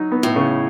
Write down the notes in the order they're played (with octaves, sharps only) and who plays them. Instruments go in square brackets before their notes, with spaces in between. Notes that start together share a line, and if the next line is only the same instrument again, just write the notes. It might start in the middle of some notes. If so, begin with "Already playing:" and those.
Already playing: [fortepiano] F#3 D#4
B3
[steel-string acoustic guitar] A2
[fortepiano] C#3